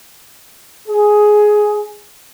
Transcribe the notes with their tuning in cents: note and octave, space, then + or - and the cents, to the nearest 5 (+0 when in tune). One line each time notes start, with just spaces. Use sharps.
G#4 +10